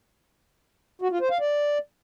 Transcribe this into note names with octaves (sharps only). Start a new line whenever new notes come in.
F#4
F4
C5
F5
D5